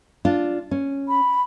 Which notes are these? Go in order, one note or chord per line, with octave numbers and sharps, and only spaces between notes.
D4 F4
C#4
B5